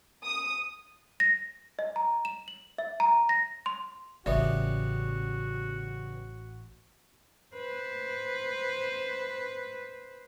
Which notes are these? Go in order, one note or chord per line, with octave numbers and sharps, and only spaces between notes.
D#6
A#6
D#5
A#5
E7
F#7
E5
A#5
A#6
C6
A1 C#3 G3 B3 F#4 D5 E5
B4 C5